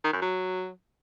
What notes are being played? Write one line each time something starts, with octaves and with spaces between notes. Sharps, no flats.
D#3
F#2
F#3